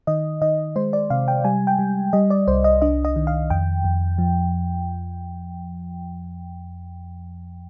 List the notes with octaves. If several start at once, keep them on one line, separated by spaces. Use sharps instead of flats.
D#3 D#5
D#3 D#5
G#3 C5
D5
C3 F5
G5
G3 G#5
G5
G3
G3 D#5
D5
C2 C5
D#5
D4 D#5
D#5
D#3
F5
F2 G5
F2
F3